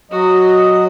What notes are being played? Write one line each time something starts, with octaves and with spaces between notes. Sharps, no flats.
F#3 F#4 D#5